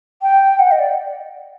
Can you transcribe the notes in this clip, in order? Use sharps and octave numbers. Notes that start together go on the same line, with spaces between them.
G5
F#5
D#5
D5